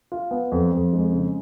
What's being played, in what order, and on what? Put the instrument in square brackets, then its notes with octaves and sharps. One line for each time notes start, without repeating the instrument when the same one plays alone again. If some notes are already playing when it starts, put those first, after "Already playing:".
[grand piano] F4
B3
F2
F2
G#3
C#3